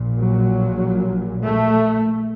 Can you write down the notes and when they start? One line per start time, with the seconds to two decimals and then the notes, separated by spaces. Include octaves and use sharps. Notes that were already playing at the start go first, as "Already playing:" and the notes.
Already playing: A#1 A#2
0.20 F#3
1.44 A3